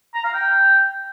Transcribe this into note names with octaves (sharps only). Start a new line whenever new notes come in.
A#5
F5
G5